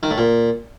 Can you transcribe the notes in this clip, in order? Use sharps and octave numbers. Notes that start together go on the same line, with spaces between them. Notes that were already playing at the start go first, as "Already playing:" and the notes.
D#3
A2
A#2